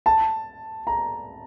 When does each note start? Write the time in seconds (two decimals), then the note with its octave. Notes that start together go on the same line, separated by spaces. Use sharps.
0.06 A5
0.87 A#5